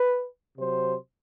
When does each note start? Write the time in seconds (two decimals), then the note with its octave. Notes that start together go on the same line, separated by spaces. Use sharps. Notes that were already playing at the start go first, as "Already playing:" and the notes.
Already playing: B4
0.57 C3 F#3 C5